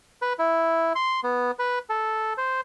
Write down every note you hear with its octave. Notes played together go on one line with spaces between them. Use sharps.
B4
E4
C6
B3
B4
A4
C5